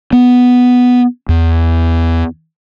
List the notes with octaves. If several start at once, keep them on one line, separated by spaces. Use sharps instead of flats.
B3
E2